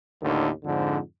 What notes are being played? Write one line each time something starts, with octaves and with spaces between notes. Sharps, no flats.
D#2 A2 D3 D#3
F2 G#2 D3